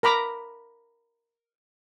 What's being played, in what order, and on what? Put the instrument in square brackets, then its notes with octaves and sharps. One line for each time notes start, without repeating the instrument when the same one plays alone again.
[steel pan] A#4 A#5 B5 D6